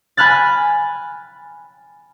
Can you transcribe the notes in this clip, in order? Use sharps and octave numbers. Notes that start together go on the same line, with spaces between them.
G#5 B5 F6 F#6 A6